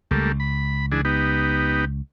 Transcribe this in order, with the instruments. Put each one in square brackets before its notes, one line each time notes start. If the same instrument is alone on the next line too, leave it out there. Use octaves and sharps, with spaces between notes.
[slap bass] C#2 [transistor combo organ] G3 A3 A#3
[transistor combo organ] B5
E3 D4 G#4
B3 D#4 G4